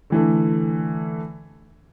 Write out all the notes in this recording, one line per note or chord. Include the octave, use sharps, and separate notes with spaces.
D3 E3 A3